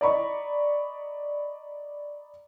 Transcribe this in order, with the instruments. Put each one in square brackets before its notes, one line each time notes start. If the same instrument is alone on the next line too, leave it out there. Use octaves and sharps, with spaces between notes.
[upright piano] D5 D#5 A#5 B5 C#6